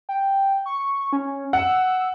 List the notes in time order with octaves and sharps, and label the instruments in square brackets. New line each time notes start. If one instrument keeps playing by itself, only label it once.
[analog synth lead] G5
C#6
C#4
[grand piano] F#5 [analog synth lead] E6